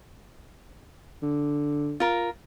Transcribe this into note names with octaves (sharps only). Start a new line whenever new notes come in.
D3
F4 A#4